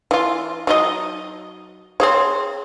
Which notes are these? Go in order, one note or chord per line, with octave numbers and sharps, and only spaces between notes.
E3 F4
F#3 D#4 D#5
C4 G#4 C#5